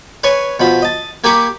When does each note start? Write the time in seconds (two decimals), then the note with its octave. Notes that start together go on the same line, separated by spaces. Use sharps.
0.24 B4 C#5 G#5 C#6
0.60 B2 F3 B5
0.82 D#5 A5
1.24 A#3 G4 G#5 B5 C#6 D6